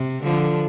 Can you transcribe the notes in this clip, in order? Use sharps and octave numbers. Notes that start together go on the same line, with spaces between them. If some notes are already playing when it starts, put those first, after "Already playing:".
Already playing: C3
D3 F3